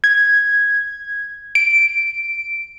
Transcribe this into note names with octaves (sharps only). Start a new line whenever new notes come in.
G#6
D7